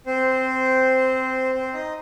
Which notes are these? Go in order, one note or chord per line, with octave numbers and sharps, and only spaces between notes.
C4 C5
C4 C5
D#4 D#5